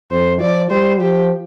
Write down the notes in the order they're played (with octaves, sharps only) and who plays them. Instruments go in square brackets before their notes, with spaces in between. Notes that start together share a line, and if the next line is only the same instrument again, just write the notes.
[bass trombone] F2 [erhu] C5
[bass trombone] F3 [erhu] D5
[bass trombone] G3 [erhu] C5
[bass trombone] F3 [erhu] G4